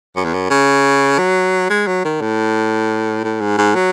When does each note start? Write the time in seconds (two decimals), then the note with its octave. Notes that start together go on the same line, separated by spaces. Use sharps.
0.16 F#2
0.24 E2
0.33 F#2
0.50 C#3
1.18 F#3
1.70 G#3
1.87 F#3
2.04 D#3
2.21 A2
3.24 A2
3.41 G#2
3.58 G#2
3.75 F#3